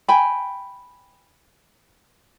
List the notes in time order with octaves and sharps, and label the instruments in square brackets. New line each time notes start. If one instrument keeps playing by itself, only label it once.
[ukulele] G5 G#5 B5